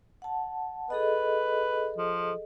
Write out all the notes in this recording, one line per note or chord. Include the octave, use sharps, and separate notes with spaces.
F#5 A5
G#4 A4 B4 D#5
F3